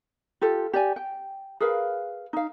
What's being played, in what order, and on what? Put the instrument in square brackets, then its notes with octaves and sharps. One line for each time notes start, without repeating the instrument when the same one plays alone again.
[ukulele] F4 G4 A4
G4 D5 G#5
G5
G#4 A#4 B4 F5
D#4 F5